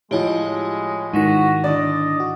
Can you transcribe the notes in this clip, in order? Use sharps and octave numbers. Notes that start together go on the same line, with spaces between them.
A2 F3 G#3 G4 C#5 D#5
G#2 D#3 D#4 E4 F#4 A#6
D3 D5 D#5
F#4